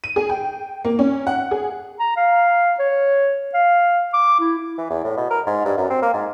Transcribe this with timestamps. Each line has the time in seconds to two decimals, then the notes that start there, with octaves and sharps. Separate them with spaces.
0.04 D#7
0.16 G#4
0.29 G5
0.85 A#3
0.99 C#4
1.27 F#5
1.51 G#4
1.99 A#5
2.16 F5
2.79 C#5
3.54 F5
4.14 D6
4.40 E4
4.78 E3
4.90 E2
5.04 A2
5.17 B2
5.31 A#4
5.47 G#2
5.65 G2
5.77 F#2
5.90 C4
6.02 A#3
6.14 G#2